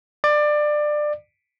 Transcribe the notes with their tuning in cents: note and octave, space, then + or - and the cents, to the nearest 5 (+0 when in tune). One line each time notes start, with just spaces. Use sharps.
D5 +20